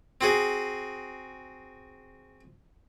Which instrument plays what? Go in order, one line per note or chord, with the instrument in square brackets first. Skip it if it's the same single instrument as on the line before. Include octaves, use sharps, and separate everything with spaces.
[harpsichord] C4 F#4 G#4